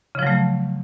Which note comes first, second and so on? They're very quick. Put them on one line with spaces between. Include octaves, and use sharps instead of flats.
C#3 F3 F#3 A3